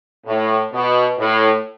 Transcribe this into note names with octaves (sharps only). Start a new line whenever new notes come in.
A2
B2
A2